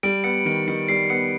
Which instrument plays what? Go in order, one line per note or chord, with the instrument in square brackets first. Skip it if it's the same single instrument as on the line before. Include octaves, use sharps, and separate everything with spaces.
[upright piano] G3 [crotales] D7
[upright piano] B3 [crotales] C#7
[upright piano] D#3 [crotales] D7
[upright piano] D#3 [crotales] C#7
[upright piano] G3 [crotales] C7
[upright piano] B3 [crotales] C#7